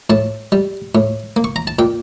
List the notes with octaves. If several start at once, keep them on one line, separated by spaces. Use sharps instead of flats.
A2 A5
G3
A2
A#3
C#6
A#5
A5
A#2 G5